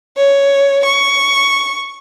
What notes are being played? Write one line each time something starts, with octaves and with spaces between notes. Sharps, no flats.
C#5
C#6